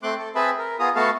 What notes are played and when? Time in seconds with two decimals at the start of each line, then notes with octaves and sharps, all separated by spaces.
0.03 A3 C4 C6 D6 F#6
0.18 A4
0.35 C4 G#4 B4 E5 A5 B5
0.59 A#4
0.79 B3 F4 G#4 A#5 D#6
0.95 A3 B3 F#4 A4 F5 A5